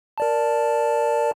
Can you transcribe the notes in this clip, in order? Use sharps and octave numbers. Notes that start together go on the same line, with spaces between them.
A#4 D5 A5